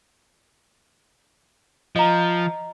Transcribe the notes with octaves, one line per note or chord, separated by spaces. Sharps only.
F3 D#5 A#5